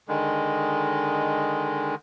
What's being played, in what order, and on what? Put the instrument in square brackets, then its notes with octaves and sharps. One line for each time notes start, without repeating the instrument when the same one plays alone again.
[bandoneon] D3 D#3 G#3